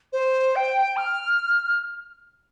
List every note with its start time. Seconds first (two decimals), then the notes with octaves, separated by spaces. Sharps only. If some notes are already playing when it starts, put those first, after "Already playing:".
0.12 C5
0.55 G5
0.96 F6